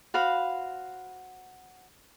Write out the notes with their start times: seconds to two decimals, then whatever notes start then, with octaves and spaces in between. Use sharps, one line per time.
0.14 F#4 C5 F5 B5